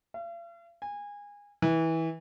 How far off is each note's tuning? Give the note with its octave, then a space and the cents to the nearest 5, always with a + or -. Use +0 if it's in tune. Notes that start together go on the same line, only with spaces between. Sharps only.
F5 -45
G#5 -25
E3 -20